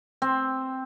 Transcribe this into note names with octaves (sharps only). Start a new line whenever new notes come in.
C4